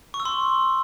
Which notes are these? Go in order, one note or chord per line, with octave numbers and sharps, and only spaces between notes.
C#6
E6
C6